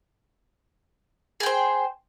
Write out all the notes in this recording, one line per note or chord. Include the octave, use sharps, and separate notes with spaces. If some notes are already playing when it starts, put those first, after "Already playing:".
G#4 C5 G5